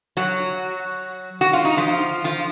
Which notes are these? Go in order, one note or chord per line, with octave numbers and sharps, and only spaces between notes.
F#3 F#4
F#4
F4
D#4
F3 F4
F3 F4